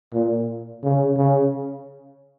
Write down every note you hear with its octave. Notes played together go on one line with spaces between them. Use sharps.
A#2
C#3
C#3